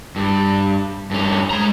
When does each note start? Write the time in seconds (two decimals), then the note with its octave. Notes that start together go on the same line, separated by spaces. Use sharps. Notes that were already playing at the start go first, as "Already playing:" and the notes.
0.16 G2
1.11 G2 C#4
1.51 G#3 A#5